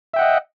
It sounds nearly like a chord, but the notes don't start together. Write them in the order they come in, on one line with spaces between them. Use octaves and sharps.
E5 G5 F#5 D#5